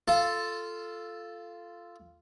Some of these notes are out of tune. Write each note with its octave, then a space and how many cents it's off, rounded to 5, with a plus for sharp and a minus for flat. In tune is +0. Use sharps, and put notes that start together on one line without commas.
F4 -10 A4 +0 A5 +0